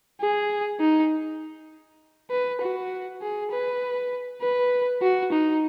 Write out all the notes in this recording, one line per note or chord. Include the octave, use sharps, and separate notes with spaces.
G#4
D#4
B4
F#4
G#4
B4
B4
F#4
D#4